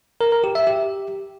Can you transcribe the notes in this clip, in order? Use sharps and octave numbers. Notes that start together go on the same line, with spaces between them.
A#4
A#4
G4
E5
G4